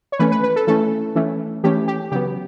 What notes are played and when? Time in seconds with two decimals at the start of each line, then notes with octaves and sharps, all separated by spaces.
0.12 C#5
0.19 E3 A3 C#4 B4
0.32 B4
0.43 B4
0.56 A4
0.67 E3 A3 C#4 A4
1.15 E3 A3 C#4
1.64 E3 A3 C#4 G4
1.88 G4
2.12 C#3 F#3 B3 G4